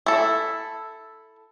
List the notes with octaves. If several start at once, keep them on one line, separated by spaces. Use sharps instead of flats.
E4 A4